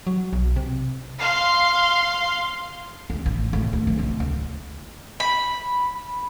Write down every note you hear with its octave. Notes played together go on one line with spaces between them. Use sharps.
F#3
B1
C3
F5 C6
D2
A1
A2
D#2
D1
C2
D2
B5